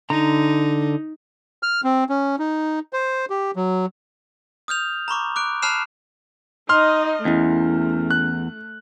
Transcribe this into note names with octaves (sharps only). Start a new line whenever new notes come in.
D3 D#4 A#5
F6
C4
C#4
D#4
C5
G4
F#3
D#6 F6 G6 F7
A#5 B5 C#6 D6
D6 F#6 D7
A5 B5 F6 F#6 C7 E7
D#4 D#5 C6 F6
E2 A3 C#4 E4
F#6